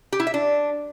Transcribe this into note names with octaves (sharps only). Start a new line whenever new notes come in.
G4
E4
E5
D4